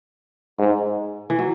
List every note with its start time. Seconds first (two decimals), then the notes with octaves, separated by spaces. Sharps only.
0.59 G#2
1.30 E3
1.39 F#3